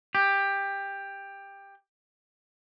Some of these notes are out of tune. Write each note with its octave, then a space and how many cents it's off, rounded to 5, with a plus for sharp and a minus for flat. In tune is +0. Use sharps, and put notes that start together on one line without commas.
G4 +15